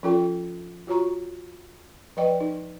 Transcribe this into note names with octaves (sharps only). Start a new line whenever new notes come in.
F3 C#4 F4 A4 G5
F4 F#4 C#5 A#5 C#6
F3 B4 D5 D#5 G5
D#4